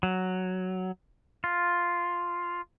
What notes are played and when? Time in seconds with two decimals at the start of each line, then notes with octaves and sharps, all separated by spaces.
0.03 F#3
1.44 F4